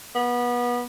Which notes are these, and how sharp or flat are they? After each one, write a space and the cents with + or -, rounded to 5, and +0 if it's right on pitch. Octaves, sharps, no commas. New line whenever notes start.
B3 -25